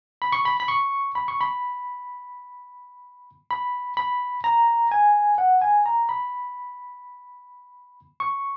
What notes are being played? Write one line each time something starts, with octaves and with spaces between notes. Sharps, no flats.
B5
C#6
B5
B5
C#6
B5
C#6
B5
B5
B5
A#5
G#5
F#5
G#5
A#5
B5
C#6